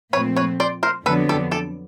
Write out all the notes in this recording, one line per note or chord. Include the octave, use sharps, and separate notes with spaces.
A#2 F3 A3 C4 B4 C#5
B4 C#5
C5 D5
A#4 C5
F2 D3 F#3 B3 D4 A4 B4
G4 A4
G4 A4